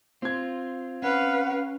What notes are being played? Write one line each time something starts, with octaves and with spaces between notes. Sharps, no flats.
C4 F4 G#6
C#4 B4 F5 F#5